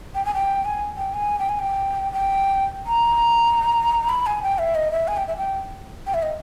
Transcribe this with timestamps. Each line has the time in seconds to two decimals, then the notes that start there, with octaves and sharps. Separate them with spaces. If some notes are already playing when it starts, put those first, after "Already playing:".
0.15 G5
0.25 G#5
0.34 G5
0.65 G#5
0.97 G5
1.14 G#5
1.39 G5
1.49 G#5
1.59 G5
2.12 G5
2.87 A#5
4.09 B5
4.26 G#5
4.43 G5
4.59 E5
4.75 D#5
4.92 E5
5.08 G#5
5.17 G5
5.27 E5
5.37 G5
6.07 G5
6.14 E5
6.23 D#5